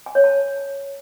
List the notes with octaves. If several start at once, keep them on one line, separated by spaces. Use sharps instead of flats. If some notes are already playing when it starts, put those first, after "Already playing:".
G#5
C#5
A5